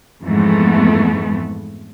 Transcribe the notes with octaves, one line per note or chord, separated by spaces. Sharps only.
F2 G#2 E3 G#3 A3 B3